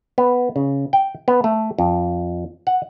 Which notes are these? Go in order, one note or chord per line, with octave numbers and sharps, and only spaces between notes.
B3
C#3
G5
B3
A3
F2
F#5